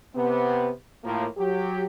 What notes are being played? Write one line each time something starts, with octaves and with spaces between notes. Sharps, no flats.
C3 B3
A2 F3 A#3
F#3 G4